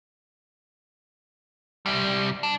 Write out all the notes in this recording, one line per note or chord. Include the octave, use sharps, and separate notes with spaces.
C2 G3
D4